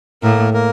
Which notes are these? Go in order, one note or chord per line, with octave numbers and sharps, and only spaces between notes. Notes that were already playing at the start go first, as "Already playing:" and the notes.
A2 A#3 A#4
A#3 A#4